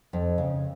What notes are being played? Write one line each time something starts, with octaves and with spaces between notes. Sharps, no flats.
F2
C#3